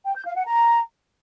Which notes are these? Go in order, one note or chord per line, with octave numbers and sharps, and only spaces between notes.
G5
G6
F5
F#5
A#5